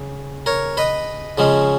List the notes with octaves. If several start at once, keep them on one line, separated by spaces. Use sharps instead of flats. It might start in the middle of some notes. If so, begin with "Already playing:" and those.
Already playing: C#3
A#4 C#5
B4 D#5
C#3 F3 G#3 C#4